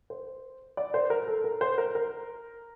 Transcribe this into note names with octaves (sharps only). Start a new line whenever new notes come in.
C5
D5
C5
A#4
A4
A#4
C5
A#4
A#4